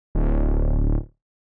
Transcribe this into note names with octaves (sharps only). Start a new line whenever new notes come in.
D1